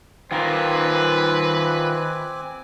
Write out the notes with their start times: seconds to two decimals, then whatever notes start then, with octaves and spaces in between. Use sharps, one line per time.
0.31 D#3 C4 F4 A#4 B4 G#5 D6